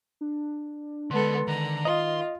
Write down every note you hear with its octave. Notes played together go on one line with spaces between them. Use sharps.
D4
D3 G#3 B3 A4 C6
D3 D#3 A#5
F4 D#5 A#5 C6